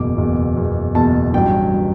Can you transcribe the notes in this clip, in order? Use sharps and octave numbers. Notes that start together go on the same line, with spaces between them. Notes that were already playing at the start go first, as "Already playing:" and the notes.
Already playing: F#1 E2 B2 D6
F#1 E2 B2
F#1 E2 B2
F#1 E2 B2 A5
A1 G2 F#3 G5
F#3